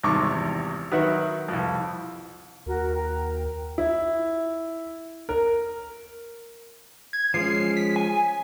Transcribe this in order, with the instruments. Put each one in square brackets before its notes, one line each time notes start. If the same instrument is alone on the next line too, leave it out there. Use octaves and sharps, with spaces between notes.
[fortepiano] G#1 E2 C3 G3 C#6 D6
D#3 F#3 B4 E5 F#5
C2 F2
[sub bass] D#2 [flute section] F#4 A#4
[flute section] A#4 G5 A#5
[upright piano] E4
A#4
[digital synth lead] G#6
[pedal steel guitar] F3 G#3 C#4 [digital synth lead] C7
[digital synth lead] B6
G#5